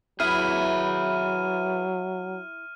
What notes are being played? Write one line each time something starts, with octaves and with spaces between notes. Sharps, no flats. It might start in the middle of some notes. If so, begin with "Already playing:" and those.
F#3 E4 G#4 B4 F6 D#7